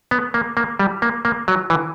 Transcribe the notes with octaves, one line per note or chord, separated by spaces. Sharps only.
B3
A#3
A#3
G3
A#3
A#3
F#3
E3